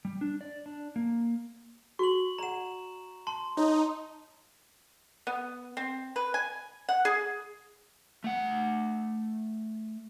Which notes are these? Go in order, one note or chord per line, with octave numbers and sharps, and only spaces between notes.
G3
D4
D5
D4
A#3
F#4 C#6 F#7
D5 F#5 A#5 E7
A5 C6
D#4 C#5
B3
C4
B4
G#5
F#5
G#4
A3 F#5